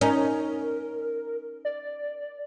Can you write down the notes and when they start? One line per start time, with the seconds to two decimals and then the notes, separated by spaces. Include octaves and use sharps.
0.01 C#4 D#4 A#4
1.65 D5